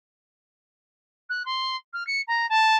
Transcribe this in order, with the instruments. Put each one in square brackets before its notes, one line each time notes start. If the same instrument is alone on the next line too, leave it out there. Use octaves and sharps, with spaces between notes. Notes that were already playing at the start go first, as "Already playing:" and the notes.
[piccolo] F#6
C6
F6
C#7
A#5
A5